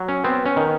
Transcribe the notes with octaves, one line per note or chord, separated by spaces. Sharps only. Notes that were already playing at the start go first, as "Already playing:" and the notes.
Already playing: F#3
C#4
B3 C4
C#4
D#3